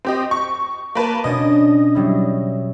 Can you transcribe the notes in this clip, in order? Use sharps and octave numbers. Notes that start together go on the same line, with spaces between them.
C4 G4 D#5
C#6
A#3 B4 A5
B2 C#4 D4 D#5
F#3 G3 E4